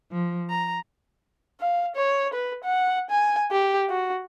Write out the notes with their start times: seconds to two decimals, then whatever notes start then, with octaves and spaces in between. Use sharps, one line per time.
0.11 F3
0.50 A#5
1.60 F5
1.96 C#5
2.34 B4
2.64 F#5
3.10 G#5
3.51 G4
3.90 F#4